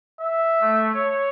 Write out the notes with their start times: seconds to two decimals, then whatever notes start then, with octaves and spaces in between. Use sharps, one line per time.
0.21 E5
0.61 A3
0.94 C#5